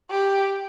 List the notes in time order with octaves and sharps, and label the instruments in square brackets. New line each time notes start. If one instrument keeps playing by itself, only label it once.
[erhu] G4